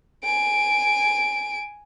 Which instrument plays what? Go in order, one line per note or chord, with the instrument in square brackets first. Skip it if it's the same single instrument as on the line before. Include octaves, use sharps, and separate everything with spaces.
[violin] G#5 D7